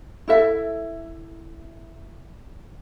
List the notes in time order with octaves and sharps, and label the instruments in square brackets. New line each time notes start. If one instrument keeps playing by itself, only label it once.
[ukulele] E4 A4 E5